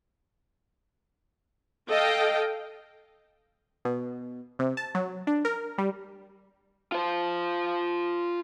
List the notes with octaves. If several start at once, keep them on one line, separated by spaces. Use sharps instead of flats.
A4 D#5 F5 G5
B2
C3
A5
F#3
D4
A#4
G3
F4 C5